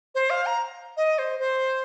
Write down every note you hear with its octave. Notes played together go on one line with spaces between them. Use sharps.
C5
F5
A#5
D#5
C5
C5